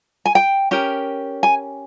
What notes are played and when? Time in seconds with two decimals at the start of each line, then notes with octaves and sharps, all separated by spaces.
0.25 G#5
0.35 G5
0.71 C#4 G4 A#4
1.43 G#5